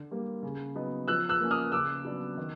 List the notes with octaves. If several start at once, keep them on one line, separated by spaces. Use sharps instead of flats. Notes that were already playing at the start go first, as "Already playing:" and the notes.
Already playing: D3
G3 A#3
C#3
F#3 B3 D#4
F3 E6 F#6
E6 F#6
A#3 C#4
D#6 F6
C#3 D6 E6
F#3 B3 D4
D#3